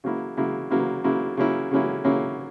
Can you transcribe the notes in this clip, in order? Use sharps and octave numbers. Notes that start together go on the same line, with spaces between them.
C#3 F#3 A#3 E4
C#3 F#3 A#3 E4
C#3 F#3 A#3 E4
C#3 F#3 A#3 E4
C#3 F#3 A#3 C#4 E4
C#3 F#3 A#3 C#4 E4
C#3 F#3 A#3 C#4 E4